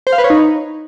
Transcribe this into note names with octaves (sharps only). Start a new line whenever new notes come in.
C5
F5
B4
C#5
D#4